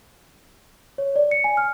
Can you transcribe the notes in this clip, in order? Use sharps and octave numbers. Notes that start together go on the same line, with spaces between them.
C#5
D5
C#7
G#5
F6